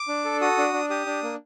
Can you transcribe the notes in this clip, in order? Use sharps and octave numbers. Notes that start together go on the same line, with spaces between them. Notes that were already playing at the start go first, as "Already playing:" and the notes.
Already playing: D6
D4
A4
F#4 D#6
D4
D4
G4 D#6
D4
A#3